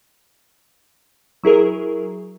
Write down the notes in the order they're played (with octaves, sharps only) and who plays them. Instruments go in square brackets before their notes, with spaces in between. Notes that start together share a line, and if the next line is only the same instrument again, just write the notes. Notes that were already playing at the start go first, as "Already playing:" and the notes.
[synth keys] F#3 E4 G#4 A#4